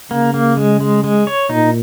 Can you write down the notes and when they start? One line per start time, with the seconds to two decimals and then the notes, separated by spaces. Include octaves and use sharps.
0.11 C#3 A#3
0.34 A#3
0.57 G#3
0.81 G#3
1.04 G#3
1.27 C#5
1.50 A#2 D#4